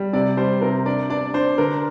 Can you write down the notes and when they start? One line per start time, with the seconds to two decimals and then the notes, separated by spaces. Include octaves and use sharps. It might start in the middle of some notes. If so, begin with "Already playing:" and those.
Already playing: G3
0.13 C3 D5
0.37 G3 C5
0.61 C3 A#4
0.86 D4 D5
1.10 D4 D5
1.34 D4 C5
1.58 D3 A#4